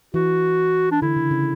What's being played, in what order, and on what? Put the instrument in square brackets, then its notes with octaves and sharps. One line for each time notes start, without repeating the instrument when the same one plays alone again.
[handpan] E3 [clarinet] F#4
[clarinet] D4
[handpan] D3 [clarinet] E4
[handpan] C#3
C#3